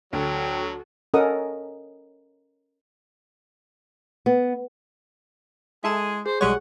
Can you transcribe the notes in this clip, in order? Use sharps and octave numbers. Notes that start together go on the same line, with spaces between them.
D2 F#3 F#4 A4 G5
C#4 A4 A#4 D#5 F#5 D#6
B3
G#3 E4 G#4 A4 E7
G#4 C5
B1 G3 G#3 C#5 F#5